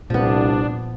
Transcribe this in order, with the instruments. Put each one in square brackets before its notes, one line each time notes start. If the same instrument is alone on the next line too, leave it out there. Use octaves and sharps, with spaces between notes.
[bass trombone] C2 [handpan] A#2 [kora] F3 B3 [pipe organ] D4